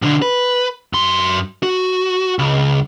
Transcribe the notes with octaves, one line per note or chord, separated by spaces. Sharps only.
B1 D3
B4
F#2 C6
F#4
C#2